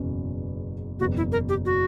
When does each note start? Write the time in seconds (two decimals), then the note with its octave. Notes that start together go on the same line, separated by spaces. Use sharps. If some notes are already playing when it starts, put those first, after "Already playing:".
Already playing: F#1 E2 B2 F#3 C#4
1.00 F#1 E2 B2 F#4
1.17 E4
1.32 A#4
1.49 G4
1.65 F#4